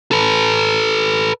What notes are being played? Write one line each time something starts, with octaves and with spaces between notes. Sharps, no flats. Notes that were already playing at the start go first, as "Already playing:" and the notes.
A4 B4